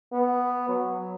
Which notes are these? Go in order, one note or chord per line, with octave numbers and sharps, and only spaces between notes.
B3
F#3